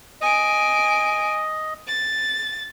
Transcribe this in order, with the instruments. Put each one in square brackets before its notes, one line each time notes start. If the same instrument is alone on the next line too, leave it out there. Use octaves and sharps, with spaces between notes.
[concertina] D#5 [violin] G#5 D7
[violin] A6